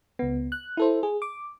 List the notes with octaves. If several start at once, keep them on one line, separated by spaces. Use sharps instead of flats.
C#2 B3
F#6
E4 A4 C5
G#4
D6